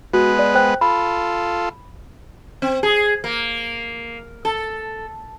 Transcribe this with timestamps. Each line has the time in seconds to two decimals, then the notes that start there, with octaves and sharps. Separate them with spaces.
0.13 G#3 B3 F#4 B4
0.39 D5
0.55 C5 G5 F#6
0.81 F4 A4 B5
2.62 C4
2.83 G#4
3.24 A#3
4.45 A4